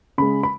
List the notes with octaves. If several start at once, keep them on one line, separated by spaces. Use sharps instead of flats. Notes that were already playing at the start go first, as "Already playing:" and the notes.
C#3 G#3 B5
B5